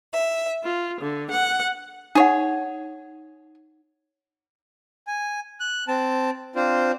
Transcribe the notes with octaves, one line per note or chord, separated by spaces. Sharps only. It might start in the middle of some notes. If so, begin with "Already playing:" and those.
E5
F4
D3
F#5
D#4 G#4 C#5 F#5
G#5
F#6
C4 A5
C4 D4 F4 C5